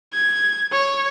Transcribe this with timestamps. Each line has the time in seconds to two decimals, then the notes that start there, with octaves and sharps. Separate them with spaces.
0.13 G#6
0.72 C#5